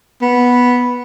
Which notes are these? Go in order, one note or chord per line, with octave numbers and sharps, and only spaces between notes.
B3